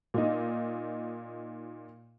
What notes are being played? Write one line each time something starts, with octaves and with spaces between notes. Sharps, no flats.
A#2 D#4